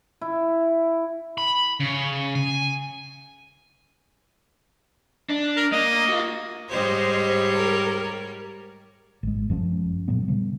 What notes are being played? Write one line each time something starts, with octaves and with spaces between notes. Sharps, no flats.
E4
B5
C#3
G#5
D4
A#4
A#3 D#5
F4 F#4
G#2 G3 C5 C#5 D#5
A#4
G#1 G#3
F#2 F3 C4 C#4
A#2 F3 F#3 B3
C#3 G3